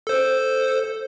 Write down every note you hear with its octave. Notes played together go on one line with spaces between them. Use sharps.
A4 C5